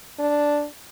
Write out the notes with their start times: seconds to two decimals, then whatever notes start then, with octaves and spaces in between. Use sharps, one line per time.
0.19 D4